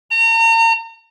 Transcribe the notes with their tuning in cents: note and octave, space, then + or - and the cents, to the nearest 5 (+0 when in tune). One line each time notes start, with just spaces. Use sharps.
A#5 -40